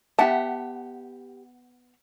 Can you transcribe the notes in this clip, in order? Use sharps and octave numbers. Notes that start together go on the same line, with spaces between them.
B3 G4 E5 F#5 A5